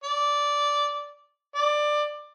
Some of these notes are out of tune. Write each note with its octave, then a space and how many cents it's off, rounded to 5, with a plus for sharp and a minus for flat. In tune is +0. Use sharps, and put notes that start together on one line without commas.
D5 -10
D5 +15